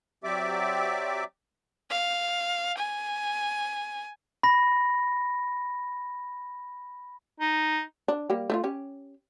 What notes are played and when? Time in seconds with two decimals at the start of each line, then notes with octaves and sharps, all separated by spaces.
0.24 F#3 C4 G4 D5 E5 D6
1.91 F5
2.78 G#5
4.43 B5 A#6
7.40 D#4
8.08 D4
8.30 G3 A#3 G4
8.50 A3 E4 F4
8.64 C#4 G4